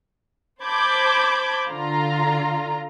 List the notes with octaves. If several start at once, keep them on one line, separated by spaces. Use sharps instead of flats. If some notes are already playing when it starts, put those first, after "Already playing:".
C5 A5 B5 D6 G6 G#6
D3 F4 A#5